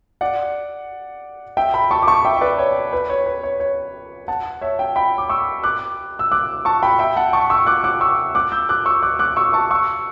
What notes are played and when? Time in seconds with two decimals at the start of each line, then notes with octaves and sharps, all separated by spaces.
0.21 D5 F#5
1.57 E5 G5
1.74 G5 B5
1.91 A5 C#6
2.03 D6
2.07 A5 C#6
2.25 E5 G5
2.37 E5
2.41 B4 D5
2.58 C#5
2.93 B4
3.10 C#5
3.26 B4
3.43 C#5
3.60 C#5
4.28 F#5 A5
4.61 C#5 E5
4.79 E5 G5
4.96 G5 B5
5.18 D6
5.29 C#6 E6
5.64 D6 F#6
6.19 E6
6.32 D6 F#6
6.65 A5 C#6
6.83 G5 B5
6.99 E5 G5
7.16 F#5 A5
7.33 A5 C#6
7.50 C#6 E6
7.67 D6 F#6
7.84 D6 F#6
8.01 C#6 E6
8.35 D6 F#6
8.52 E6 G6
8.69 D6 F#6
8.86 C#6 E6
9.02 D6 F#6
9.19 D6 F#6
9.36 C#6 E6
9.53 A5 C#6
9.71 C#6 E6